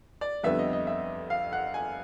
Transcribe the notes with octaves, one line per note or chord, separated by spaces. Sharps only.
D5
F2 D3 G3 B3 E5
D#5
D#5
E5
F5
F#5
G#5